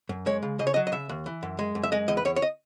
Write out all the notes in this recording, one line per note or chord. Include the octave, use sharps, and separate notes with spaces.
F#2
G#3 C#5
C#3
C#3 D#5
C#5
F#3 D#5
D#5
C#3 E5
D#2
E3
F#2
G#3
F#2
E5
G#3 D#5
E2 D#5
B4
E2 C#5
C#5
D#5